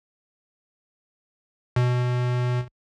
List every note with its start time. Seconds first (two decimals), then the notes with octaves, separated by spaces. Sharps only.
1.76 B2